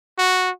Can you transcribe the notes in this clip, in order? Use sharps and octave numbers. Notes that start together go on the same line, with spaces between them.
F#4